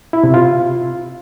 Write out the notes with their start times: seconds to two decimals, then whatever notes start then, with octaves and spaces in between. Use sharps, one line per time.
0.13 E4
0.24 C3
0.34 F4